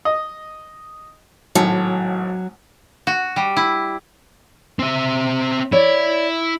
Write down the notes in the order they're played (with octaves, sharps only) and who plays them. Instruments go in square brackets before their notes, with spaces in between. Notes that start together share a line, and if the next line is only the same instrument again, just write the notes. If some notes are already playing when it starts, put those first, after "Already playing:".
[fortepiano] D#5
[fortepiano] G#1 A2 [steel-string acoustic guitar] F#3
[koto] F#4
G3
E4
[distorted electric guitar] C4 E5
[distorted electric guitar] E4 [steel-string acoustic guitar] C#5 D5